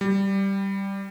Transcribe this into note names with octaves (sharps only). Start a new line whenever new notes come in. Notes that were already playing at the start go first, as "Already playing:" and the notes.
G3